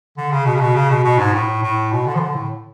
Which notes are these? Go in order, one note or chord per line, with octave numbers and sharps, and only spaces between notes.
D3
C#3
B2
C#3
B2
C#3
B2
B2
G#2
A2
A2
B2
D3
F3
D3
A2